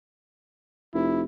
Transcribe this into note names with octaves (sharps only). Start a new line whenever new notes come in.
F1 E4